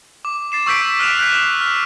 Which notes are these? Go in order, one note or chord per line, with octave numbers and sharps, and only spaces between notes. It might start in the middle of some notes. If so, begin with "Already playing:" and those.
D6
A6 C7 E7
C#6 E6 G6 B6 D7
F6 F#6 B6 D7 E7 F7
F#6 G6 C7
F6